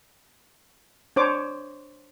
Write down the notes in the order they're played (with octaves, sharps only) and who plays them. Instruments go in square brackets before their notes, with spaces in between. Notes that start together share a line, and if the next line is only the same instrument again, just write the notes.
[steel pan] D4 C5 C#5 D6